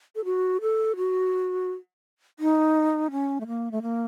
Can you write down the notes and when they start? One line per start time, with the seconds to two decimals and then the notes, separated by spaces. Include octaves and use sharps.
0.15 A4
0.25 F#4
0.61 A4
0.97 F#4
2.39 D#4
3.11 C#4
3.41 A3
3.47 A#3
3.72 A3
3.82 A#3